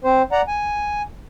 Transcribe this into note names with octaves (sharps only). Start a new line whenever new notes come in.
C4 C5
D5 F#5 A#5
G#5